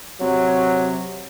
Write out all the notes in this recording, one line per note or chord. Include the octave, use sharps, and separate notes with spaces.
C3 F#3